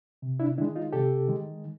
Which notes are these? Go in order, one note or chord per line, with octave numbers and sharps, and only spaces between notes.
C3
D4 E4
D#3 G#3 D4 E4
D#4 F4
C3 G4 A4
D#3 G#3